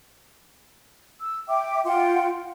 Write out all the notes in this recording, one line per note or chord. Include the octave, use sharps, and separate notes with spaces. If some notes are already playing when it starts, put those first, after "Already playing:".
E6
E5 G5 D6
F4 F#5 G5 C6